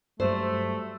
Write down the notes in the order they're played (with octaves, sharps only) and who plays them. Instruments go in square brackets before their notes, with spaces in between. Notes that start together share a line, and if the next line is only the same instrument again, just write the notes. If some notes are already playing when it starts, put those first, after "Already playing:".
[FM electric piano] G2 F#3 G3 [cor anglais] A3 [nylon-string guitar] C5